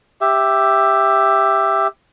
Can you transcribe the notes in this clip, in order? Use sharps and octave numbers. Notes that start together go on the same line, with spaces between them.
G4 E5